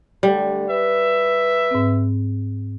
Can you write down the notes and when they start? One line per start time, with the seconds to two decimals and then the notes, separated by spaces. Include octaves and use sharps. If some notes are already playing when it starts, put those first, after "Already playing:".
0.23 D3 G3 A3 G5
0.69 B4 E5
1.71 G#2 C4